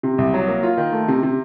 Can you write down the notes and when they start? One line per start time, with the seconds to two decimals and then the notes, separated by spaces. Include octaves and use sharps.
0.03 C3
0.18 C2
0.34 F#3
0.48 A#3
0.63 F4
0.77 D#3
0.93 A3
1.08 C3
1.23 C3